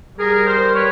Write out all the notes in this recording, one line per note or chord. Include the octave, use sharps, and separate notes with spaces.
G3 G#4 A#4
A#4 C5
B4 C#5